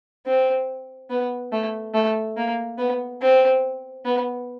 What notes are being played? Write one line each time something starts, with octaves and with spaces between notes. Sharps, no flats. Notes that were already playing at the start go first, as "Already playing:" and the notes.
C4
B3
A3
A3
A#3
B3
C4
B3